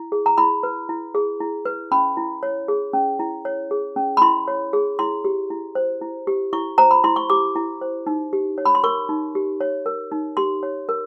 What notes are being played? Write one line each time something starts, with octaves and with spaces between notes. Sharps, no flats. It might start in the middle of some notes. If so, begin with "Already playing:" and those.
Already playing: E4
G#4
A#5
E4 B5
B4
E4
G#4
E4
B4
C#4 B5
E4
C#5
G#4
C#4
E4
C#5
G#4
C#4
B5
E4 C6
C#5
G#4
E4 C6
G4
E4
C5
E4
G4
E4 C#6
C5 A#5
B5
E4 C6
C#6
G4 D6
E4
C5
D#4
G4
C#5
B5
C6
A#4 C#6
D#4
G4
C#5
A#4
D#4
G4 C6
C#5
A#4